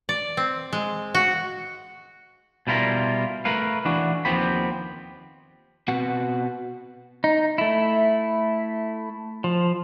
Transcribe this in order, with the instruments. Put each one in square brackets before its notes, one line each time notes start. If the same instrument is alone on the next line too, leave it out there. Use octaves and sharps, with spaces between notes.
[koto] D5
C4
G#3
F#4
[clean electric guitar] B2 G3 E4 F4 A#4
A3 A#4 B4 F5
E3 D4 F#4
D#2 F3 B3 C4 G4 B5
[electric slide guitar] B2 C4 F#4 B4 F#5
[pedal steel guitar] D#4
A3 E4
F3